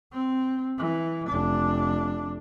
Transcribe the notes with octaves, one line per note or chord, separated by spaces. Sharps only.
C4
E3
F1 D4